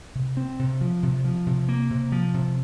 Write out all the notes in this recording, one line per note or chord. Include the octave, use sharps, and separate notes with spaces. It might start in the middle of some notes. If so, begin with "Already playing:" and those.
C3
C4
C3
F3
C3
F3
C3
A#3
C3
F3
C3